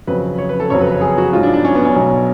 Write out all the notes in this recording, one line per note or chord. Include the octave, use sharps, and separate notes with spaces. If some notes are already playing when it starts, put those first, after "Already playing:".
F2 C#3 F#3 B4
C#5
B4
A4
F#1 F2 C#3 F#3 C#5
B4
B4
G#4
F#4
A1 G#2 F#3 F4
D4
D4
C#4
B3
C#4
B1 B2 F#3 C#4